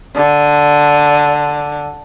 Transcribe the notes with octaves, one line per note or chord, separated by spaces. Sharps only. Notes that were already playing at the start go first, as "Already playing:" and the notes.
D3